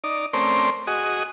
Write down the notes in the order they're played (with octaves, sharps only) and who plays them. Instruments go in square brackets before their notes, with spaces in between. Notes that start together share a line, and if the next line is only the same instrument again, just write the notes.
[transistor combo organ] D#4 D5
A3 C4 C#4 A#4 C5 D5
F#4 G#4 D#5